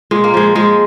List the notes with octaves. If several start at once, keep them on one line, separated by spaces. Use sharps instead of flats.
A#2 G#3
A#3
F3 G#3
F3 G#3